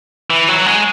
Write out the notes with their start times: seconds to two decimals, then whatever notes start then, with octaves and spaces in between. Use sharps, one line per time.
0.30 E3
0.49 F#3
0.66 G#3